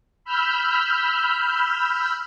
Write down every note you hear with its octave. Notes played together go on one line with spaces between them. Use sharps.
B5 E6 F6 G6